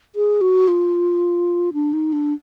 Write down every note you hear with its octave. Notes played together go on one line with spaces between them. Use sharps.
G#4
F#4
F4
D4
D#4
D4